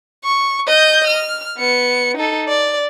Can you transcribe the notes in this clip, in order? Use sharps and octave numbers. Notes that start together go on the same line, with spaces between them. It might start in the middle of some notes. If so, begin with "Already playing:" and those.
C#6
D#5 G6
F6
B3 C#7
D#4 A4
D5